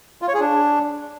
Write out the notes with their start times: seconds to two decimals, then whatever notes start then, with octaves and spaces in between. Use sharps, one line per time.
0.22 F4
0.28 C#5
0.34 G#4
0.40 D4